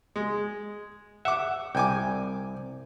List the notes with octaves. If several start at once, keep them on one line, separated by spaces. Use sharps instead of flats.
G#3
E5 F#5 D6
C2 G5 G#5 D6